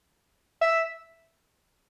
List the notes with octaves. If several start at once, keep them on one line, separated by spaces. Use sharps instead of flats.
E5